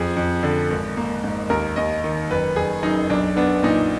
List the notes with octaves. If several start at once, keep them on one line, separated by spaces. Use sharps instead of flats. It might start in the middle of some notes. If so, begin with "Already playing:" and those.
Already playing: F2 F3 G#4
F2
D3
G#1
A#3
G#2
D#2 A#4
D#2 D#5
D#3
F#1 B4
F#1 G#4
F#2 D#4
B1 D4
B3 D4
A#2 D#4